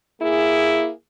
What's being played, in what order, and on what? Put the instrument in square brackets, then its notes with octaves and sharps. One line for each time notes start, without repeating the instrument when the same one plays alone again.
[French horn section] A#3 E4 G#4